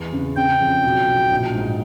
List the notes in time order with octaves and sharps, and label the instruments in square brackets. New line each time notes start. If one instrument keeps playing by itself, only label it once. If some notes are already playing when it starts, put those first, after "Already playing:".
Already playing: [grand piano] E2
C#3
[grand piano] C#3 [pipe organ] G5
[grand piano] F2
B1
B1
A#1
G#2